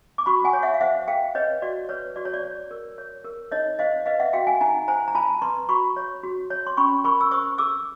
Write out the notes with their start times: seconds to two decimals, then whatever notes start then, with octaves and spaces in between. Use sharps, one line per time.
0.18 D6
0.26 F#4 B5 C#6
0.44 F#5 G#5
0.53 C#5
0.63 E5 F#5
0.74 F5
0.81 C5 E5 F#5
1.08 A4 F5 G5
1.35 B4 C#5 D#5
1.62 F#4 D5
1.89 B4 C#5
2.16 F#4 D5
2.25 C#5
2.34 D5
2.43 C#5
2.71 A#4
2.98 C#5
3.24 A#4
3.52 D#4 C#5 D#5
3.79 C5 D#5 F5
4.06 B4 D#5 F5
4.20 E5 F#5
4.33 F#4 F5 G5
4.47 F#5 G#5
4.61 D#4 G#5 A#5
4.88 C5 G#5 A#5
5.08 A#5
5.15 F4 A5 B5
5.42 B4 A#5 C6
5.69 F#4 B5 C#6
5.96 C#5
6.23 F#4
6.50 C#5
6.67 C6
6.77 C#4 B5 C#6
7.04 A#4 B5 C#6
7.21 E6
7.31 C5 C#6 D#6
7.58 A4 D6 E6